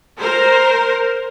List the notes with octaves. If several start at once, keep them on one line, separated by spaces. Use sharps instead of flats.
A#4 C5